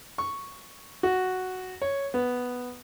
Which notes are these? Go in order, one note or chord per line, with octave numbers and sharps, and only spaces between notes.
C#6
F#4
C#5
B3